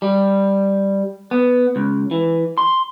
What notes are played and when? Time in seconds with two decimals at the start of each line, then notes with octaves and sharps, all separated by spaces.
0.02 G3
1.31 B3
1.76 C#2
2.11 E3
2.58 C6